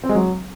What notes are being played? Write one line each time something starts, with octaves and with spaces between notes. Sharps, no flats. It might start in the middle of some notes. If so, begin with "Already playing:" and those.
C4
G#3
F#3